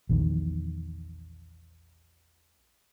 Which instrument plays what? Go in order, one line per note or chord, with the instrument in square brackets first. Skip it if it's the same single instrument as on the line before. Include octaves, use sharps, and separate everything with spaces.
[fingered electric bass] A#1 E2 D#3